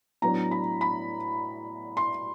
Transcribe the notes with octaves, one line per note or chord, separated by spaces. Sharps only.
A2 F#3 B3 D4 A#5
B5
B5
C6